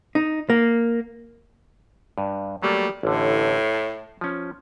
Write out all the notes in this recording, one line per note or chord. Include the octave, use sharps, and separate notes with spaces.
D#4
A#3
G2
F#3 G3 A3 A#3
A1 A2 D3
A5
F3 C#4